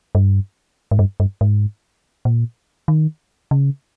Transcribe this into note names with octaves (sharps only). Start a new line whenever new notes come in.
G2
G#2
G2
G2
G#2
A#2
D#3
C#3